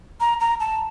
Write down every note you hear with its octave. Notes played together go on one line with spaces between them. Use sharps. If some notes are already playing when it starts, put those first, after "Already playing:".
A#5
A#5
A5